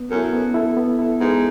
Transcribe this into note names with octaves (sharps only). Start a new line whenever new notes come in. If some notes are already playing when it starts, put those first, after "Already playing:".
Already playing: B3
F#2 E4 A4
B3
E4 A4
B3
E4 A4
G#2 B3